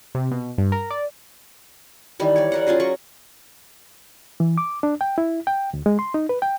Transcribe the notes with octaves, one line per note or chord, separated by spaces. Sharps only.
C3
B2
G2
A#4
D5
D#3 E3 G3
C#5 D5
G3 A#4 F#5
C#4 F4 F#4 G#4
F#3 C#6
E3
D6
D4
G5
E4
G5
D2
G#3
C6
D#4
B4
G5